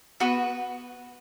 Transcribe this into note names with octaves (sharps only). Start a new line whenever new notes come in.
B3 F#4 B4